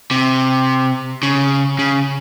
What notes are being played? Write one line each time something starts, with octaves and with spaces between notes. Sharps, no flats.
C3
C#3
C#3